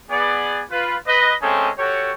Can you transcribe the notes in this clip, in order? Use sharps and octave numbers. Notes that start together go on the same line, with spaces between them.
B3 G#4 D5
F4 B4
B4 D#5
G#3 A3 C4 C#4 G#4 A4
F#4 G4 A4 C#5